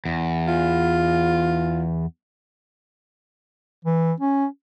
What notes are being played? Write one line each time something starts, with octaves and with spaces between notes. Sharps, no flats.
E2
F4
E3
C#4